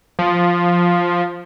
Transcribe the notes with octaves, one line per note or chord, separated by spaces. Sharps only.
F3